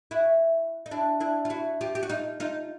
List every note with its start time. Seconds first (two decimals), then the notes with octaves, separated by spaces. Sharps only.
0.11 E4 F#4
0.86 D#4
0.91 D4 E4
1.20 D4 E4
1.45 F4
1.50 E4 F#4
1.81 F4 G4
1.95 G4
2.03 F#4
2.09 D#4 F4
2.40 D#4 F4